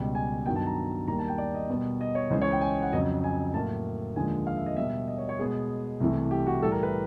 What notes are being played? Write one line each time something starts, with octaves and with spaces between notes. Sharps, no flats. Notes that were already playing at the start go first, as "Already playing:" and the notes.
Already playing: C#2 B2 G3
G#5
G2 D#3 F#3 B3 G5
A5
A#5
D#2 D#3 G3 A#3 A#5
A5
G5
D5
D#5
B2 G3 B3
D#5
C#5
C#2 C#3 E3 G#3 C5
C#5
G5
G#5
F#5
F2 C#3 F#3 D#5
G#5
A2 F#3 A#3 A5
D#2 D3 F3 G#3 G#5
F5
E5
D#5
B2 G3 B3 E5
D#5
C#5
C#5
B2 G#3 B3 G#4
C2 C3 E3 A3
G4
F#4
A2 E3 G3 A4
A#4
B4